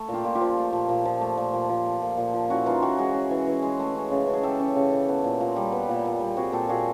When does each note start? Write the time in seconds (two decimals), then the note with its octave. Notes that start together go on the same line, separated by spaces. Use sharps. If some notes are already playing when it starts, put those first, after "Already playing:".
Already playing: A3
0.09 A#2 F4 G4
0.25 A#2
0.35 F4 G4
0.41 F3
0.57 A3
0.73 A#2
0.89 A#2
1.05 F3
1.21 A3
1.37 A#2
1.53 A#2
1.69 F3
1.85 A3
2.02 A#2
2.17 A#2
2.34 F3
2.50 C#4 E4 F#4
2.66 E3 D#4 F4
2.82 E3 E4 F#4
2.98 G#3 F#4 G#4
3.14 C#4
3.31 E3
3.47 E3
3.62 G#3
3.79 A3
3.95 C#4
4.11 C#3
4.27 E3
4.33 G#4
4.43 A3 G4 A4
4.60 C#4
4.76 C#3
4.92 E3
5.08 B3
5.24 A#2
5.40 A#2
5.56 G3
5.72 B3
5.89 A#2
6.05 A#2
6.20 G3
6.36 C4 F#4 G#4
6.52 A#2 G4 A4
6.69 A#2 F#4 G#4